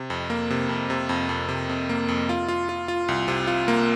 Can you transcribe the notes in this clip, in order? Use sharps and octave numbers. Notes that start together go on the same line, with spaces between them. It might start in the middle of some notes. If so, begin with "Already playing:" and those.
Already playing: C3
F2
A#3
C3
F2
C3
F2
F2
C3
F2
A#3
F2
F4
F4
F4
F4
C2
C3
F4
A#3